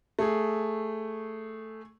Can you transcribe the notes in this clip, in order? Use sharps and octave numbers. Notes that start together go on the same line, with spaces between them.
A3 G#4